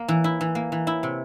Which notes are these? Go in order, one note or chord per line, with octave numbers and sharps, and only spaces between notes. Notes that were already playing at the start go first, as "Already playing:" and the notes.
Already playing: A#3
E3
E4
E3
A#3
E3
E4
C3